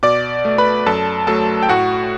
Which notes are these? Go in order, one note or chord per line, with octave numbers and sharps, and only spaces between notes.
B2 D5 D6
A3
B4 B5
F#2 A4 A5
F#3 A3 A4 A5
G5
A2 F#4 F#5